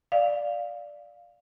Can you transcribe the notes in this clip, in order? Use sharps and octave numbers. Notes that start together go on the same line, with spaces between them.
D5 F5